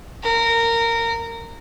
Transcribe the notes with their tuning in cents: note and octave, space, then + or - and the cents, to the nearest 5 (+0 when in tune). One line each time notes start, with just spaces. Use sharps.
A#4 -15